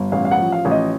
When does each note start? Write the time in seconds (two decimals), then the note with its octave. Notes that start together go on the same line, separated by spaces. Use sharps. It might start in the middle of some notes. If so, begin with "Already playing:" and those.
Already playing: G1
0.12 A1 F5
0.25 F5
0.31 F#5
0.38 F3
0.52 F5
0.65 A1
0.71 D#5